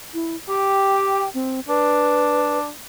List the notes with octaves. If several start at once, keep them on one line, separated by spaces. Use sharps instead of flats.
E4
G4 G5
C4
D4 B4